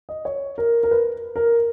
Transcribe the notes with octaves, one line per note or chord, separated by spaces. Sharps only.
D#5
C#5
A#4
A#4
B4
A#4